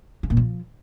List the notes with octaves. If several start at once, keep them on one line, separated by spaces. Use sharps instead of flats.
C#3
A#2
F3